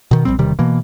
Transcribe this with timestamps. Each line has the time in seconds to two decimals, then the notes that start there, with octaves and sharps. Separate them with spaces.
0.11 B2 D#3
0.25 A#1 F#2 G3 C4
0.39 E1 C3 D#3 G3
0.59 B2 E3 A#3